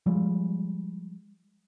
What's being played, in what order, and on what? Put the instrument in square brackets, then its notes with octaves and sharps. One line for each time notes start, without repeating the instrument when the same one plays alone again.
[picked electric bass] F3 G3 G#3